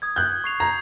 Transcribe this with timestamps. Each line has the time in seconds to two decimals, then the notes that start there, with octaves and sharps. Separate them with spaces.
0.02 D#6 G#6
0.16 F#6 G6
0.32 G#6
0.44 C#6 C7 F7
0.60 A#5 G#6